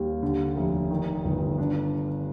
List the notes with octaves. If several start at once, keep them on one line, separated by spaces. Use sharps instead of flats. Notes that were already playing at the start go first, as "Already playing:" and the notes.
Already playing: D#2 G3
D3
F1
D#3
G1
D4